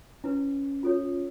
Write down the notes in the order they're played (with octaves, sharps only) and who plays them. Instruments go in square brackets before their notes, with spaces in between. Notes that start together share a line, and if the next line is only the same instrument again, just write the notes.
[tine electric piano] C#4 [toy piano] E4 B4
[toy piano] F4 A4 C#5